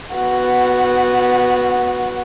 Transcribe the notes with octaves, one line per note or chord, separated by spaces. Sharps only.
B3 F#4